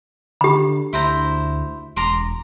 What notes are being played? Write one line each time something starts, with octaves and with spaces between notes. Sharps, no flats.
D3 G4 B5
D2 E4 C5 A#5
E1 A#5 C6 D6